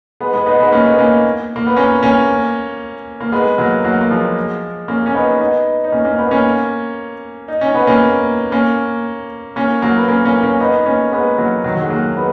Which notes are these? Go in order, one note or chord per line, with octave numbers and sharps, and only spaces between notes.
G#3 B3
G#3 B3
B3 D#4
G#3 B3
A#3 C#4
B3 D#4
A#3 C#4
A#3
B3
A#3 C#4
A#3 C#4
A#3
G#3 B3
F#3 A#3
F#3 A#3
A#3
F3 G#3
A#3 C#4
C#4
B3 D#4
B3 D#4
D#4
A#3 C#4
A#3 C#4
B3 D#4
A#3 C#4
D#4
C#4
B3
A#3 C#4
A#3 C#4
A#3 C#4
F#3 A#3
B3
A#3 C#4
A#3 C#4
A#3 C#4
B3 D#4
A#3 C#4
G#3 B3
F#3 A#3
D#3 F#3
F#3
G#3
F#3 A#3
G#3 B3